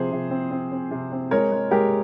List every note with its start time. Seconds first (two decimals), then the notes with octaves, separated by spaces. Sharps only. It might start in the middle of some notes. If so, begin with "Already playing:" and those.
Already playing: C3 F3 G#4 C5
0.12 C3
0.31 C4
0.51 C4
0.72 C4
0.91 C3
1.12 C4
1.31 G#3 A#4 C#5
1.52 G#3
1.71 G#3 G4 A#4